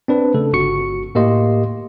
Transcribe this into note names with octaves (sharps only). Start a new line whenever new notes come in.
C4 D4 B4
C#3 A3 A4
G1 F#4 C#6 C#7
A2 A#3 G4 D#5 C6